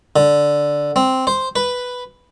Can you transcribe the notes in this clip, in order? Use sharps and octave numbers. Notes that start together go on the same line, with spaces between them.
D3
C4
C5
B4